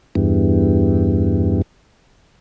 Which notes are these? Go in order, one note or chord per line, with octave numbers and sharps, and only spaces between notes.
E2 G2